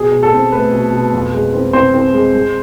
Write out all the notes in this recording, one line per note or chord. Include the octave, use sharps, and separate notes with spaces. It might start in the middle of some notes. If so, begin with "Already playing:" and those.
Already playing: B2 G#4
B2
A4
C4
A3 B4
B2
B2
F2
G#3
C4
C4 C5
C4
G#3
G#3